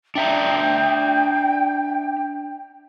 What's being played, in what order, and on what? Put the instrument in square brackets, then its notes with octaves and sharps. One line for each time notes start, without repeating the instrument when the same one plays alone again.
[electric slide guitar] D4 E5 A#5 [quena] G5